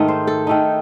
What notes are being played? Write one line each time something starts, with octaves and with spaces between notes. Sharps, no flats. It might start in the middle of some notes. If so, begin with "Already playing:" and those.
Already playing: G#2 D#3 A3 D#4 D#5
C5
A4
D#3 A3 D#4